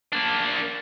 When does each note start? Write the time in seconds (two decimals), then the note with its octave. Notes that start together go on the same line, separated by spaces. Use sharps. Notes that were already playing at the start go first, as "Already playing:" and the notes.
0.13 A#3 D4